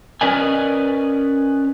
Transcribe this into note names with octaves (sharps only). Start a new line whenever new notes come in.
C#4 A#4 B4 D5 D#5 G#5